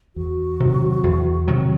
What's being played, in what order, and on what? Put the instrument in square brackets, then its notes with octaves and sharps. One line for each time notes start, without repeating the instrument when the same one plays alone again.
[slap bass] E2 [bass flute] F#4
[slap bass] C3 D#3 F#3
E2
C3 D#3 F#3